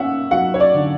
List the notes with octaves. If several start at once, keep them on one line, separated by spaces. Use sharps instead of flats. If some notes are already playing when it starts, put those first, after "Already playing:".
Already playing: A#3 C#4 E5 F#5
F#3 F#5
C#5
D5
D3